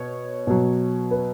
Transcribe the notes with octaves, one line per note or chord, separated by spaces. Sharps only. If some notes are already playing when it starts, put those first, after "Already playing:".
Already playing: B2 C#5
B2 F#3
B4